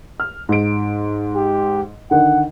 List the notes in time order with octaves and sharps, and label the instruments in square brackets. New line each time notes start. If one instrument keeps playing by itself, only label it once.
[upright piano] F6
G#2 D7
[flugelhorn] G4
[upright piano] D3 D#3 [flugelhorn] F#5